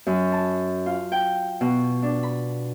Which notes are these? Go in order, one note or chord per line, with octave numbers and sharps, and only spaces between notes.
F#2
A5
F4
G5
B2
D4
B5